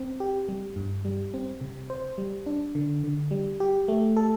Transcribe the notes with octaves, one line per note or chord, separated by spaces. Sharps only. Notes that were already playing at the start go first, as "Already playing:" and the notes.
Already playing: C4
G4
G3
G2
G3
C4
C3
C5
G3
D4
D3
D3
G3
G4
A3
A4